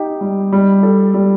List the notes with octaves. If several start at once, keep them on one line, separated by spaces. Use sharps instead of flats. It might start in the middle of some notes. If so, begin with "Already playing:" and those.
Already playing: D#4 G4
G3
G3
A4
G3